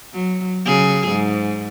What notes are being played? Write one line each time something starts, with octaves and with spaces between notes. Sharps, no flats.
F#3
C#3 F#3 G#4
G#2